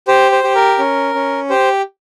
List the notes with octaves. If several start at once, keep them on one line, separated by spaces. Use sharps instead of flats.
G4 C5
C5
G4
A#4
C#4
C#4
G4 C5